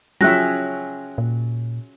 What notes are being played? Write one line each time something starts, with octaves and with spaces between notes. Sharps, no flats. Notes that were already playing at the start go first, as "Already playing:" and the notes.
F3 F#3 C#4 G#4 E5 G5 F#6 A#6
A#2